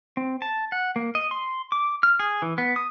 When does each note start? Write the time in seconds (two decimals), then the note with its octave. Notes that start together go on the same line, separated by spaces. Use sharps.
0.17 C4
0.42 A5
0.72 F#5
0.96 A#3
1.15 D#5
1.31 C6
1.72 D6
2.03 F6
2.20 G#4
2.42 E3
2.58 B3
2.76 D#6